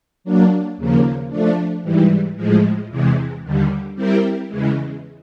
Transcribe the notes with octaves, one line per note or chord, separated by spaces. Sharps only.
F#3 A#3 D4
D#2 C#3 F3 A#3
F3 A3 D4
G#2 E3 G3
A2 F3 G#3
E2 C3 E3 G#3
D#2 D3 G3
G3 C4 E4 G4 A#4
E2 C#3 E3 G#3